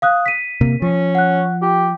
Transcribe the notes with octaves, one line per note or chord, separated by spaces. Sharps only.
F5 D#6 F#6
B6 D#7
C3 A#3
F3 C#4
F#5 F#6
F4 G4